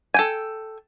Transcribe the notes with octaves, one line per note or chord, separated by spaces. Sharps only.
A4 G5 G#5